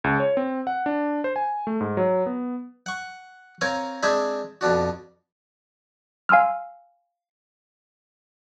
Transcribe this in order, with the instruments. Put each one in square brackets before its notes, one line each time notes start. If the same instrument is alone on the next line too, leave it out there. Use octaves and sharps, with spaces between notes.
[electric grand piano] C#2
C#5
C4
F#5
D4
C5
G#5
A3
G#2
F#3
B3
[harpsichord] F#5 C#6
C4 A#4 C#5 F5 G#5 A#5
G#3 C4 D4 G#4 C5 E5
F2 B2 D4 F#4
[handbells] F5 G#5 C6 E6 F6